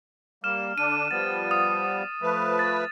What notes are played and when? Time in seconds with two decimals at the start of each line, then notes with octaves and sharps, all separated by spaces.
0.44 G3 A#3 F6 E7
0.78 D3 D4 D#7
1.11 F3 G3 B3 A6
1.51 D#6
2.22 F3 A3 B4
2.59 A6